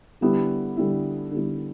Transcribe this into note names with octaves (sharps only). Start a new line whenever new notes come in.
D3 G3 B3 E4
D3 G3 B3 E4
D3 G3 B3 E4